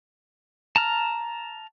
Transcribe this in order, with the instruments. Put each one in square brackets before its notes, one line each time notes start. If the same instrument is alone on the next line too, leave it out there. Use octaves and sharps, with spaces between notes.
[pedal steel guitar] A5 A#5 F6